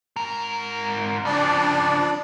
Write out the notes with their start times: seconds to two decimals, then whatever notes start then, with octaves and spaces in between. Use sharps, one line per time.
0.16 G#2 A#4
1.25 C#3 F3 D4 D5